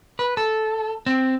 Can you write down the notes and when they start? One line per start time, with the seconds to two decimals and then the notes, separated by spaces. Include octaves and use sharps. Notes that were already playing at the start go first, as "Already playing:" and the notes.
0.19 B4
0.37 A4
1.06 C4